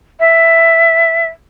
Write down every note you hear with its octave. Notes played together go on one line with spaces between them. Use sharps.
E5